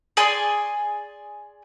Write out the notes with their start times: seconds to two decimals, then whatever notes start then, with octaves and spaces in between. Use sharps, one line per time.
0.17 G#4 D5 G#5 C6